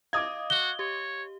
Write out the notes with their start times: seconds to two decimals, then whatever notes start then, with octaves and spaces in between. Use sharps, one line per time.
0.13 D#5 F5 D6 D#6 G#6
0.50 F#4 G7
0.79 G4 C#5